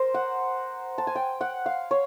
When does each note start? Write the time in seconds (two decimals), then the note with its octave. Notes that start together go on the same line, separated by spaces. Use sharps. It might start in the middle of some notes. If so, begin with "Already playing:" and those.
Already playing: A#4 C5
0.14 F#5
0.98 A5
1.07 G#5
1.15 G5
1.41 F#5
1.66 F5
1.91 C#5